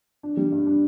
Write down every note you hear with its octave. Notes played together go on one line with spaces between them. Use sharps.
D4
G3
G2
D4